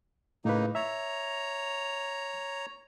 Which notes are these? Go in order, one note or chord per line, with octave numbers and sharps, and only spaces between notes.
A2 C#3 A#3 D#4 B4
C#5 E5 A#5